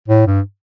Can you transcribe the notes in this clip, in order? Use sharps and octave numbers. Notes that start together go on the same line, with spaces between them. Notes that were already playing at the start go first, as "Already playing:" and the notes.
A2
G2